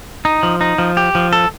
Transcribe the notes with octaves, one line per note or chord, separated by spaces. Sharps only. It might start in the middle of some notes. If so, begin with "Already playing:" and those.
D#4
F3
D#4
F3
G4
F3
A4